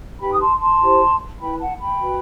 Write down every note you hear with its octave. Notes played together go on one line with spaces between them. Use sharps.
D#4 G4 B4 G5 B5
D#6
A5 C6
A5 C6
E4 G4 C5
E4 B4 G5 B5
F#5 A5
G5 B5
F#4 B4